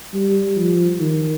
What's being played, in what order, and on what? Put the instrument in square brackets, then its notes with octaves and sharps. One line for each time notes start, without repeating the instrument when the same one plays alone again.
[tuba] G3
F3
D#3